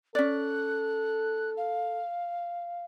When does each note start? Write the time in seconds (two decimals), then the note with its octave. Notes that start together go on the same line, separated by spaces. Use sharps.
0.15 C#4 A4 D5 F#6
1.57 F5